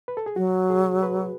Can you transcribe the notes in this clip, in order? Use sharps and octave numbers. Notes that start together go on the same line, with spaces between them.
B4
A4
G#4
F#3 F#4
G#4
B4